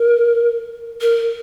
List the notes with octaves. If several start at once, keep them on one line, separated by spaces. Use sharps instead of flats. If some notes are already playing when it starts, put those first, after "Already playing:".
Already playing: A#4
A#4